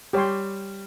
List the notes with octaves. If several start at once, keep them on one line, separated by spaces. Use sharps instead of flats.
G3 G4 C#5 G5 C6